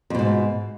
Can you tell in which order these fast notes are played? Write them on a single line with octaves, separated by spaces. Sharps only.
F2 B2 G#2